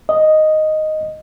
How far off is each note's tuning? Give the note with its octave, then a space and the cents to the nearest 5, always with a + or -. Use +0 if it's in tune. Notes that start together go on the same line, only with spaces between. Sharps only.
D#5 +0